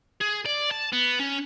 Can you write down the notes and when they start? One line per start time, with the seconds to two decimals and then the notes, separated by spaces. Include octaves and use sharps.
0.21 G#4
0.46 D5
0.71 A5
0.92 B3
1.19 C#4